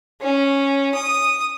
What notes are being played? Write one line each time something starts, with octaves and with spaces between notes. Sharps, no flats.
C#4
D#6